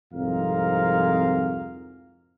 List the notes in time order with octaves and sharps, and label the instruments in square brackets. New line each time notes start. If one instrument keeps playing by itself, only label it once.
[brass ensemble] C2 F2 G#2 A#4 F5